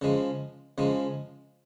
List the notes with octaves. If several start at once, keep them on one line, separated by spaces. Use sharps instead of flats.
C#3 F3 G#3
C#3 F3 G#3